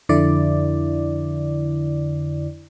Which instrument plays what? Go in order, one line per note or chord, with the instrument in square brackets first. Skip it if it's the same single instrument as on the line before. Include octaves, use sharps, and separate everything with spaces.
[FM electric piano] F2 D3 E4 D5